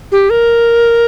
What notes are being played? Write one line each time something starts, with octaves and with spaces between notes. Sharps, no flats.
G4
A#4